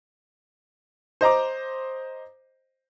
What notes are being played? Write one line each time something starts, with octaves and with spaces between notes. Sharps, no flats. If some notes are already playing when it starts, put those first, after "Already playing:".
C5 D#5 A#5 D6